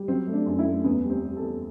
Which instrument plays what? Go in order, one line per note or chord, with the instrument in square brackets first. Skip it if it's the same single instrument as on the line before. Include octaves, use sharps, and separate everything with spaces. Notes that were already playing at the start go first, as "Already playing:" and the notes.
Already playing: [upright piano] G3
F#3 C4
A3
D4
F#2
E4
A3
E2 B3
G3
C4
G3
A4
E2